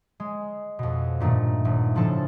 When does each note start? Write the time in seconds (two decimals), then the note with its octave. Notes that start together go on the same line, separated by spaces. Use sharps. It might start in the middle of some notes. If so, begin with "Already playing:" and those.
0.20 G#3
0.79 F2 B2
1.20 G2 A#2 D#3 A3
1.65 D#1
1.95 A2 C#3 F3 C4 D4 A4